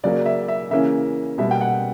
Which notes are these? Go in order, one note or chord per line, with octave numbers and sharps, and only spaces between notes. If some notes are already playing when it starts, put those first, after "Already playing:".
C#3 F#3 A#3 C#4 D5
E5
E5
C#3 E3 A#3 C#4 E5
B2 G3 A#3 E5
G5
F#5